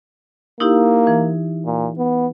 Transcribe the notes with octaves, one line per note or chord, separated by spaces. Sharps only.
A#3 D#4 E4 G4
E3
A#2
B3